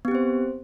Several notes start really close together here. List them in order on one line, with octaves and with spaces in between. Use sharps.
B3 G4 C4 C5